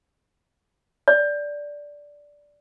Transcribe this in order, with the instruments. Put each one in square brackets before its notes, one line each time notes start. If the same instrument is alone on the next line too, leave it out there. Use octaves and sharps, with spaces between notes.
[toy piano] D5